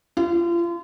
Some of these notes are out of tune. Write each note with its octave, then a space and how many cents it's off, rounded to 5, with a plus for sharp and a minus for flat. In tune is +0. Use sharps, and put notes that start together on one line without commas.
F4 -35